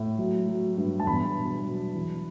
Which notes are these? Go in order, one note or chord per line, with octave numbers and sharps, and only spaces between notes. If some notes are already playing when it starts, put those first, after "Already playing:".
Already playing: A2
F#3
F#3
G2
A5
E2 B5
B2
F#3
E3